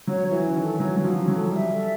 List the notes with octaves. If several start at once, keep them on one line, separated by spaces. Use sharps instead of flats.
F#3 C#5
F#4
E3
C#4
D#3
A4
F#3 C#5
F#3 F#4
F3
C#4
F#3
A4
G3 E5
A4